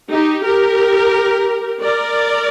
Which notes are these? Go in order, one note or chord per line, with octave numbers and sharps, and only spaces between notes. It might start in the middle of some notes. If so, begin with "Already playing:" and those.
D#4 G4
G4 A#4
A#4 D5